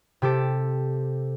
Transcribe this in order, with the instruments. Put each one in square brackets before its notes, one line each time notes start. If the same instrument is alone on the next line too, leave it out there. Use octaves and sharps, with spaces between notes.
[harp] C3 G4 A4 D7